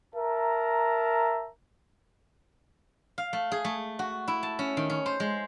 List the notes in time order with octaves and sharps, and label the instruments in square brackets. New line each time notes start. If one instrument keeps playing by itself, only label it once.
[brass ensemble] A#4 E5 A5 A#5
[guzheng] F5
A3
G#4
A3
F#4
E4
A5
C#4
D#3
C#4
C5
G#3